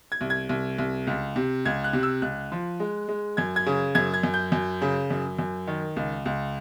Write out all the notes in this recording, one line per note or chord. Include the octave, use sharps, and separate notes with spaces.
G#6
C2
G#6
C2
C2
C#2
C3
C#2 G#6
F#6
C3
E6
C#2 F#6
F3
G#3
G#3
F#2 G#6
G#6
C#3
F#2 G#6
G#6
F#2
G6
F#2
C#3
F#2
F#2
D#3
C#2
C#2